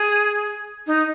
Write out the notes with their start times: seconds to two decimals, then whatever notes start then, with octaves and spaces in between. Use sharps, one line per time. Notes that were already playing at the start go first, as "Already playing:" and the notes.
Already playing: G#4
0.87 D#4